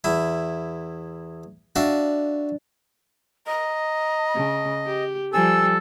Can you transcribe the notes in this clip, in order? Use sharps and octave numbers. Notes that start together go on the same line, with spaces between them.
E2 E4
D4 F#4 E5 F5
D#5 A#5
C#3
G4
F3 G3 A4 G#5 E6